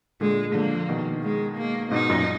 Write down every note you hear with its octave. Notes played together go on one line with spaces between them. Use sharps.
A#2 D3 G#3
D3 F3 A#3
B2 D#3
G#3
A#3
G#2 B2 D#4
F#2 A#2